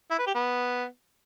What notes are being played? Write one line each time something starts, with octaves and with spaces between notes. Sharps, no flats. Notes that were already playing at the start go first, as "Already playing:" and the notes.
E4
B4
G4
B3